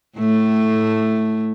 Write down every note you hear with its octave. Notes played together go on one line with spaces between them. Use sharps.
A2 A3